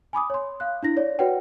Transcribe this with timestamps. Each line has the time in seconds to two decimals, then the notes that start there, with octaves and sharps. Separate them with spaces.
0.13 G#5 B5 D6 D#6
0.30 C#5 C6
0.60 F5 F#6
0.83 D4 E4 A#6
0.97 C#5 D5
1.19 F#4 B4 C#5 F#5 G5